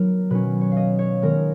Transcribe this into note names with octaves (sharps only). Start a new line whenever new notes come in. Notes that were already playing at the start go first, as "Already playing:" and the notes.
Already playing: D#3 F#3 B3 A#4
B2 F#3 C#4 B4
C#5
D#5 F5
C#5
D#3 G#3 B3 A#4